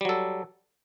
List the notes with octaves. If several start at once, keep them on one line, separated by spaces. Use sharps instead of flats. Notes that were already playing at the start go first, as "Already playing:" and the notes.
F#3 G3 A4